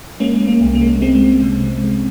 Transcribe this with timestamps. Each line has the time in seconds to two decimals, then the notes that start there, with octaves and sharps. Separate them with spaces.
0.20 G#3 A#3 C#4
0.41 G#3
0.47 A#3
0.61 C2
0.75 A#3
0.81 G#3
1.02 C2 G#3 C4
1.23 G#3
1.42 C3
1.64 G#3
1.84 G#3